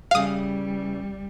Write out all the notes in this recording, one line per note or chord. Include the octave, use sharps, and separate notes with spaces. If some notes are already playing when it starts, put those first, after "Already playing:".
C#3 E3 G3 F5 D#6